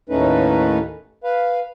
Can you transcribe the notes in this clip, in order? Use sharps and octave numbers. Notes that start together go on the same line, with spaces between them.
D#2 A2 A3 C#4 D#4 B4
B4 F5